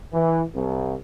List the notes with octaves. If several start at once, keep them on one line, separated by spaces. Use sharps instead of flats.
E3
C2